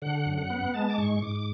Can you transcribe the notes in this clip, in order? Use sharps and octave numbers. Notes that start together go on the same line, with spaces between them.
D3 F#5
F#2
F#5
B3
G#3 A5
D6
G#2 C#6
G#2 D6
D6